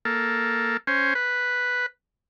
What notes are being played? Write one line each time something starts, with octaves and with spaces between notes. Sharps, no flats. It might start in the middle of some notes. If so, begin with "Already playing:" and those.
A#3 A4
C#4 C5
B4